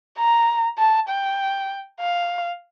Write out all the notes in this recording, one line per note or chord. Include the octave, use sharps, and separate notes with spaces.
A#5
A5
G5
F5